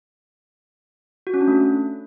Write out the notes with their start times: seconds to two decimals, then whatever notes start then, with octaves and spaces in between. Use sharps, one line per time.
1.27 F#4
1.34 C#4
1.41 D4
1.48 A3